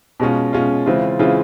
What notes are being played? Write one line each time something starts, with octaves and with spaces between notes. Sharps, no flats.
B2 G#3 C#4 F4
B2 G#3 C#4 F4
C#3 E3 G#3 C4 F4
C#3 E3 G#3 C4 F4